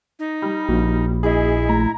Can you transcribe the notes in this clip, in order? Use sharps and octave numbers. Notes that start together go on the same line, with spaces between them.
D#4
G3
A#1 A#3 F#4
E4 G#4 D#5
A3 A#5